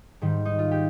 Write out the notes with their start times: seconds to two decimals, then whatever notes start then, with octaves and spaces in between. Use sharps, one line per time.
0.22 G#2 D#3 G3
0.45 D#4
0.59 F4
0.71 G4